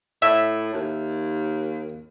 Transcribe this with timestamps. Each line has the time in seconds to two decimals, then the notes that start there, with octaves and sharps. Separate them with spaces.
0.22 A2 E5
0.74 D#2